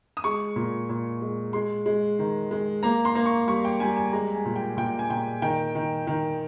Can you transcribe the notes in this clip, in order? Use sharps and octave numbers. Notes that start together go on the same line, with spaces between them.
D#6
G#3 C#6
A#2
A#2
G#3
G#3 C6
G#3
D#3
G#3
A#3 A#5
C6
A#3
C#6
G3 C#6
G5
G3 G#5
G#5
G#3 A#5
G#5
A#2
G5
A#2 G5
G#5
A#2 G5
D#3 G5
D#3
D#3